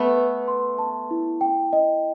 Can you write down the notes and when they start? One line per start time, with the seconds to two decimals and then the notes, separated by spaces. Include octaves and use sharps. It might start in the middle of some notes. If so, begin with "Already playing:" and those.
Already playing: A3 B3
0.17 B4
0.48 C6
0.78 A5
1.11 E4
1.41 G5
1.73 D#5